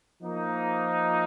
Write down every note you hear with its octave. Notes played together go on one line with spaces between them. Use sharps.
F3 A#3 D#4